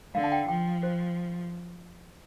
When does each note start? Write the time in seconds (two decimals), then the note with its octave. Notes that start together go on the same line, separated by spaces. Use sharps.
0.15 D3 F5
0.24 A5
0.32 G5
0.48 F3 G5
0.83 C5